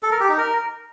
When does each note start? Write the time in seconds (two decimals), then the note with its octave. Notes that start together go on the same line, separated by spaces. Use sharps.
0.03 A4
0.12 A#4
0.20 G4
0.29 D#4
0.38 A#4